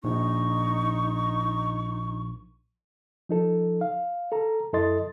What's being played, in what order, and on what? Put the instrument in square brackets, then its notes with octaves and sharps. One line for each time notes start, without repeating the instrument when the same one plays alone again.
[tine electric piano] A#1 [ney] D#4 [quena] C#6
[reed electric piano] F3 D#4 A4
F5
A4 A#5
F#2 E4 A4 D#5 C6 A6